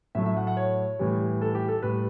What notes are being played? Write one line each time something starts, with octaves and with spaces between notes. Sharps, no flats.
A2 F#3 A3 E5
E5
F#5
F#5
C#5
A2 E3 G3
A4
G4
A4
A2 G3 B4